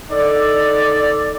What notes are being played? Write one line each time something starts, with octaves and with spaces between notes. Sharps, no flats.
D#4 A4 D5